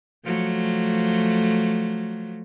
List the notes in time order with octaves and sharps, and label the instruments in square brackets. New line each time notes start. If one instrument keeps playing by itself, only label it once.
[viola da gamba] F3 F#3 A3